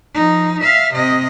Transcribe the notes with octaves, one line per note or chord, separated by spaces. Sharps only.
F3 D#4
E5 F5
C3 D#5